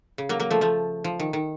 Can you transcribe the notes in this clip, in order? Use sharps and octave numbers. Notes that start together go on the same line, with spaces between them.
C#3
F#3 A#3
F#3 A#3
F3 A3
F3 A3
F3
D#3
D#3